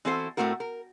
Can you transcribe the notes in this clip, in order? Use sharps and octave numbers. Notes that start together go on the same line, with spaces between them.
E3 C4 E4 F#4 A4 C5
A2 D#3 A3 C4 F#4 A#4
A#4